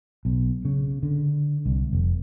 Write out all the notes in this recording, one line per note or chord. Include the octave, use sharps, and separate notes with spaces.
B1
C#3
D3
C2
F1